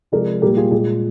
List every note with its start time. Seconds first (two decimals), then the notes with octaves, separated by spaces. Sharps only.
0.12 C3 F3 G#3 A#4 D5
0.42 A#2 G3 A#3 G4 A#4
0.57 F4 G#4
0.71 A#2 G#3